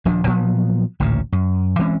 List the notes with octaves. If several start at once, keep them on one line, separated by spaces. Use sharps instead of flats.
D#1 F3 D4
A#2 F3 F#3 B3
A1 D2 A#2 C#3
F#2
E3 G#3 C4 C#4